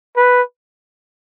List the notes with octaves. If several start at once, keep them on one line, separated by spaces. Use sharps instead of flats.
B4